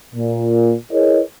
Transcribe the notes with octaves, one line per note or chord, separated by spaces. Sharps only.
A#2
E4 G#4 A#4 B4 C#5 D#5